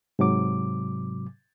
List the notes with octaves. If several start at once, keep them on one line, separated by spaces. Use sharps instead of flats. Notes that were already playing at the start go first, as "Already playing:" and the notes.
G#2 C3 F#3 D6